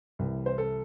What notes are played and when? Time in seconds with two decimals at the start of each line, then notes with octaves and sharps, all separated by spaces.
0.19 C2 C3 E3
0.46 C5
0.58 A4